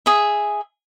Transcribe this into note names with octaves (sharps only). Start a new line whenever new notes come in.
G#4 E5